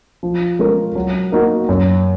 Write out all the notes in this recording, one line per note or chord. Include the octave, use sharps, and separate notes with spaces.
F3
G#3 C#4 F4 A#4
F#3
A#3 D#4 F#4
F#2